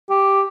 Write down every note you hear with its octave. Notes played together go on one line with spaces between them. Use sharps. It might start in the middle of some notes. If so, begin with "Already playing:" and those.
G4